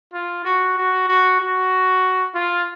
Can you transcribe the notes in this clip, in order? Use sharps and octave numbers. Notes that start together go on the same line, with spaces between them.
F4
F#4
F#4
F#4
F#4
F4